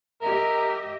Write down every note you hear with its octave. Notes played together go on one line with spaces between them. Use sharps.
G4 A#4 D#5 E5